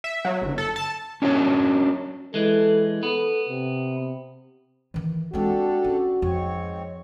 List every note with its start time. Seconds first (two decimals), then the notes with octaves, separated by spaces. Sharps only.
0.04 E5
0.25 F#3
0.42 G1
0.58 A4
0.76 A5
1.22 C#4 D4 F#4 C#5
2.34 E3 G#3 A4
3.03 B3 A4
3.49 C3
4.94 D#3 E3
5.33 G#3 C4 D4 F#4 G4 A4
5.85 C#4
6.22 F2 G#2 C4 C#5